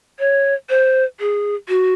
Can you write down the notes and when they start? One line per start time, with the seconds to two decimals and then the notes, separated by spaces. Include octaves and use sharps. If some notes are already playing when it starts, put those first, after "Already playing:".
0.19 C#5
0.69 C5
1.20 G#4
1.69 F#4